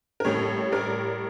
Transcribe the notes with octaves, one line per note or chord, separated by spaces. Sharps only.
A#4
A1 A2 G3 A4 C#5
A#4 D5